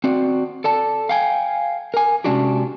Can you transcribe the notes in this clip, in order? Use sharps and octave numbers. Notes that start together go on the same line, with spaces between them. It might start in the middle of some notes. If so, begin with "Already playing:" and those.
C4 F#4 D5
A4 D5 A5
F5 G5 G#5
A#4 G#5
C3 G#3 C#4 D4 F#4 G4